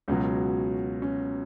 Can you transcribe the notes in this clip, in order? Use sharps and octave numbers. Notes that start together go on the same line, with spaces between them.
C#2 B2 F#3 C#4
C#4